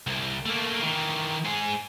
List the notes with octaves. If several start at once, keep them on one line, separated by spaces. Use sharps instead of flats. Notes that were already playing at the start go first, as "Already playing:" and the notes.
C2
A3 A#3
D#3 E3
G#2 G#4